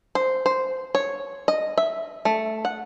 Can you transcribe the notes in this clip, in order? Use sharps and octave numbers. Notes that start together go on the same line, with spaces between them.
C5
C5
C#5
D#5
E5
A3
F#5